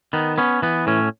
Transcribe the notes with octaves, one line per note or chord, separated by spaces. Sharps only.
D#3 B3
B3 C#4
E3 B3
A2 C#4